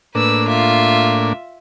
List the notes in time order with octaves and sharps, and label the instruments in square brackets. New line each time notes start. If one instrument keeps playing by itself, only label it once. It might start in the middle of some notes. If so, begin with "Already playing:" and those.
[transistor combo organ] A2 A#3 D4 [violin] B4 E6
[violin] F4 E5